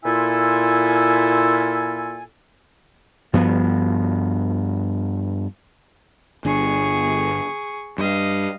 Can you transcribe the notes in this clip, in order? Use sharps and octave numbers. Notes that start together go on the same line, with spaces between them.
A#2 E4 F4 A4 E5 G#5
G2 F3 B3
G1 D4 G#4 C#6
G2 D#5 F5